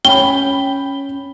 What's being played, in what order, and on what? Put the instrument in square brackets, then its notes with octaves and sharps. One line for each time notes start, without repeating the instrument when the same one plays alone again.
[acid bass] C#4 [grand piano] G5 B5 [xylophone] G7